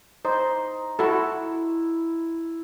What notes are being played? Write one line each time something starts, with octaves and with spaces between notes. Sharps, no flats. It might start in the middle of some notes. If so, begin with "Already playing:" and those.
D#4 C5 C6
E4 F#4 A4